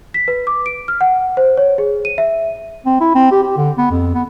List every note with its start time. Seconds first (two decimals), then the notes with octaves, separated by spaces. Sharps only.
0.14 B6
0.28 B4
0.47 D6
0.66 D7
0.88 F6
1.01 F#5
1.37 C5
1.57 C#5
1.78 G#4
2.05 D#7
2.18 E5
2.86 C4
3.01 E4
3.15 C4
3.31 G4
3.43 G4
3.57 D3
3.78 B3
3.91 F2
4.14 B3